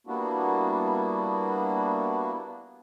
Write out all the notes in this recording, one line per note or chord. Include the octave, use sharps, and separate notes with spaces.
G3 A#3 B3 D4 E4 F#4